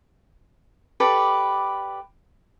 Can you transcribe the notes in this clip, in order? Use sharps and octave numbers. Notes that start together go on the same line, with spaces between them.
G4 A4 B4 D5